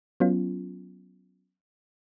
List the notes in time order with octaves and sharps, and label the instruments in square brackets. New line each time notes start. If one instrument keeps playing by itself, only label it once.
[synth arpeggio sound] F#3 B3 C#4 F4